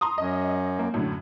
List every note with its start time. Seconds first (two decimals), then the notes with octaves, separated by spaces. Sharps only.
0.01 A#5 C6 D#6
0.18 F#2 D#5
0.79 A#3
0.94 F#2 A2 D3